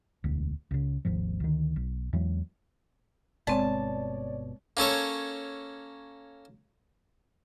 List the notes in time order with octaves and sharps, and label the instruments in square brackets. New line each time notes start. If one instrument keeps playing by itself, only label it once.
[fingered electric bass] E1 D2
C#2 C#3
G#1 D#2 G#2 F3
D2 D#3
B1
E2 E3 F#3 G#3
[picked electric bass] G1 B2 [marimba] G#3 C4 [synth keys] C#5 D5 [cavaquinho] A5
[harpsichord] A#3 C#4 A4 C#5